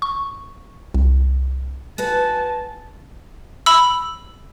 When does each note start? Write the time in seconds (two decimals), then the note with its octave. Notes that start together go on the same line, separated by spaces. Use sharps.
0.02 C#6
0.94 C2
1.98 F#4 B4 F#5 G#5 A5
3.66 B5 E6